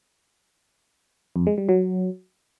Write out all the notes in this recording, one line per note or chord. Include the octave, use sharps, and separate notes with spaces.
F2
G#3
G3
F#3